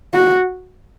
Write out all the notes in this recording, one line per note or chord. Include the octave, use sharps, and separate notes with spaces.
F#4